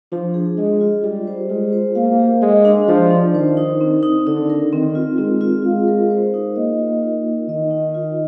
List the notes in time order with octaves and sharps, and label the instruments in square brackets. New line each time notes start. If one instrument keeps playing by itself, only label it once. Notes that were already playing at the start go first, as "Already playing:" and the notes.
[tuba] F3 [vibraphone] D4
[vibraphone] G#4
[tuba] G#3 [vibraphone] D#5
[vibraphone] F4
[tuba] G3 [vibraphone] F4
[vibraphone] C5
[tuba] G#3 [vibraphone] F4
[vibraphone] C5
[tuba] A#3 [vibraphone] F5
[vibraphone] G4
[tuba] G#3 [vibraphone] D#5
[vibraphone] D4
[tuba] F3 [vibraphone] D5
[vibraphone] D4
[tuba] D#3 [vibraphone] C5
[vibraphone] D#4
C4
D#4
[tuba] D3 [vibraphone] D#4
[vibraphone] A#4
[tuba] D#3 [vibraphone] C4
[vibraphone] F4
[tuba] G#3 [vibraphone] C4
[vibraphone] F4
[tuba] G#3 [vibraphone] F5
[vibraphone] A#4
C5
D#4
[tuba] A#3 [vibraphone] D#5
[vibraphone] F4
D#4
A#4
[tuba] D#3 [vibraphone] D#5
[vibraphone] D#4
F4